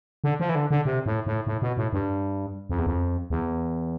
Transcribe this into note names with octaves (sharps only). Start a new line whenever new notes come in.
D3
F3
E3
D3
D3
C3
A2
A2
A2
B2
A2
G2
F2
E2
F2
E2